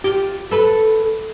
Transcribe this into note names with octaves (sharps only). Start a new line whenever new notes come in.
F4 G4
A4 B4